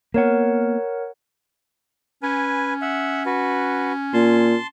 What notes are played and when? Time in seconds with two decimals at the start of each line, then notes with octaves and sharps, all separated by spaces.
0.14 A#3 B3 A#4 C#5 F#5
2.23 C#4 B4 G#5
2.82 E5 F#5
3.26 F#4 B4
4.13 A#2 A5 C6